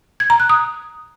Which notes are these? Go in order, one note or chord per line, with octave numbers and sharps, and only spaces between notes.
G#6
A#5
F#6
D#6